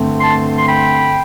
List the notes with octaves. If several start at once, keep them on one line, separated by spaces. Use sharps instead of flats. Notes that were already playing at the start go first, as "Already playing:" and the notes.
Already playing: G2 D3 A3 C4
A5 C6
C6
G5 B5